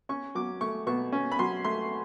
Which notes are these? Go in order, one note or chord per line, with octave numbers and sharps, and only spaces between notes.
C#4 C#6
F#3 D6
A3 C#6
B2 C#6
C#4
B5
F#3 C6
A3 C6